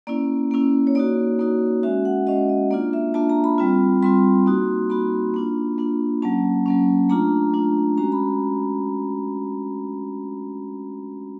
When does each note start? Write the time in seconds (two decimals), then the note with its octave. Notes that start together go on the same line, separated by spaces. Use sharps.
0.07 A#3 C#4 E4 D5
0.51 A#3 C#4 E4
0.87 C#5
0.95 A#3 D#4 F#4 D5
1.39 A#3 D#4 F#4
1.83 G#3 C#4 F#4 E5
2.05 F#5
2.27 G#3 C#4 F#4 D#5
2.49 D#5
2.71 A#3 D4 F4 D5
2.93 E5
3.14 A#3 D4 F4 A5
3.30 A#5
3.44 B5
3.58 G3 C4 F4
4.02 G3 C4 F4 C6
4.46 A#3 D#4 F#4
4.90 A#3 D#4 F#4 B5
5.34 A#3 D4 F4
5.78 A#3 D4 F4
6.22 F#3 A#3 C#4 A5
6.66 F#3 A#3 C#4
7.09 A3 D4 F4 A#5
7.53 A3 D4 F4
7.98 G#3 C#4 F#4 A#5
8.12 B5